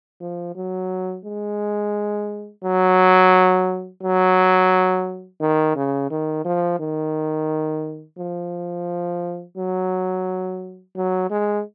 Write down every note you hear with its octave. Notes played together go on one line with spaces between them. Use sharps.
F3
F#3
G#3
F#3
F#3
D#3
C#3
D#3
F3
D#3
F3
F#3
F#3
G#3